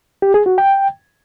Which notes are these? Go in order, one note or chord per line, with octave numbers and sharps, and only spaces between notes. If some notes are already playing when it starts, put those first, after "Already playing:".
G4
G#4
F#4
G5